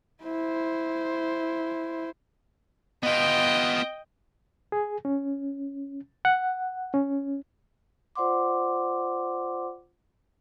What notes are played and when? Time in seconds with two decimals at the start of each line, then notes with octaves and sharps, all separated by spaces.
0.23 E4 C5
3.03 B3 F4 D#5 G5
4.72 G#4
5.05 C#4
6.25 F#5
6.94 C#4
8.16 F4 C5 D5 F#5 C6 D6